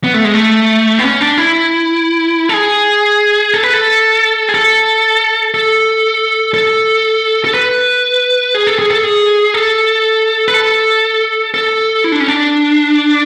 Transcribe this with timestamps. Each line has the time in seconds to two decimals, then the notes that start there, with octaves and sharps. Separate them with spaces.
0.04 B3
0.14 A3
0.24 G#3
0.34 A3
0.99 B3
1.04 C#4
1.20 D4
1.38 E4
2.49 A4
2.54 G#4
3.54 A4
3.64 B4
3.73 A4
4.49 G#4
4.54 A4
5.54 A4
6.54 A4
7.45 A4
7.54 B4
8.55 G#4
8.67 A4
8.79 G#4
8.91 A4
9.04 G#4
9.54 A4
10.48 B4
10.54 A4
11.54 A4
12.04 E4
12.12 D4
12.20 C#4
12.28 D4